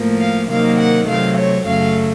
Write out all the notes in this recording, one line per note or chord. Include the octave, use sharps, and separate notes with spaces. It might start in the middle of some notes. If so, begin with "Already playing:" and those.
Already playing: A2 F3 A#3
F5
C3 D#3 F#3 A#3 F5
F#5
C3 F#3 A3 F5
C#5
F#2 C#3 F#3 A3 F5